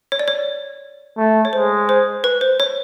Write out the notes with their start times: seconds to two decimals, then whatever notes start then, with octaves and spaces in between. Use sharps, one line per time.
0.12 C#5
0.19 D5
0.28 C#5
1.17 A3
1.45 C#5
1.53 G#3 C5
1.89 C5
2.24 B4
2.41 C5
2.60 C#5